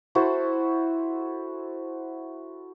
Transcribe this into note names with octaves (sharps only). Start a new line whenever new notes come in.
E4 F#4 A4 C5